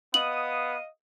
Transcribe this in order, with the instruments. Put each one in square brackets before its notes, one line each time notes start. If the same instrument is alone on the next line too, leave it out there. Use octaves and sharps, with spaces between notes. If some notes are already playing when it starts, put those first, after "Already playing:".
[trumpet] B3 [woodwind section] D#5 F5 D#6 [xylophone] F#7